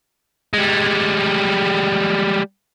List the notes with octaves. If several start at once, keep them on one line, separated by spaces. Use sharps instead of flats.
G3 G#3